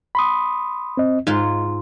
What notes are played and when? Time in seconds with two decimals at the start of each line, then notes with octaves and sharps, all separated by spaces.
0.15 B5 C6 D#6
0.97 C4 D#5
1.27 G#2 D#4 F4